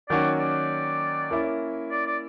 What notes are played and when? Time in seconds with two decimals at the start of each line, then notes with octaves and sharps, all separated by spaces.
0.09 D#3 F#3 A#3 C#4 F#4 D5
0.40 D5
1.31 A#3 C#4 E4
1.91 D5
2.07 D5